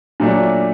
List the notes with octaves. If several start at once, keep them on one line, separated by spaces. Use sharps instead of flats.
A#2 F#3 A3 D4